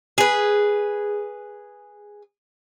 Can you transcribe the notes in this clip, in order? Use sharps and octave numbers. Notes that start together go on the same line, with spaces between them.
G#4 B4